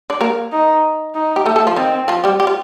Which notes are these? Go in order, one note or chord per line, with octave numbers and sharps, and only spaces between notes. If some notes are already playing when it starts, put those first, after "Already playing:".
D4 D5
A#3 A#4
D#4
D#4
G4
A3 A4
A3 A4
F3 F4
D#3 C4 D#4
F3 F4
G3 G4
G4
F4